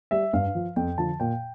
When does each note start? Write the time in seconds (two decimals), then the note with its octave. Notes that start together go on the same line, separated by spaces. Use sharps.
0.11 G3 E5
0.33 G2 F5
0.55 F3
0.76 F2 G5
0.98 D3 F3 A5
1.20 A#2 G5